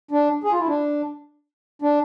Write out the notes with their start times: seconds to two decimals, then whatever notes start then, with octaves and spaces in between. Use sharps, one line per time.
0.11 D4
0.44 G#4
0.52 F4
0.60 E4
0.68 D4
1.82 D4